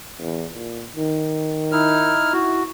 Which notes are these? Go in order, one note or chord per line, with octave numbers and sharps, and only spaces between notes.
E2
A#2
D#3
D#4 E4 F6
E4 F#4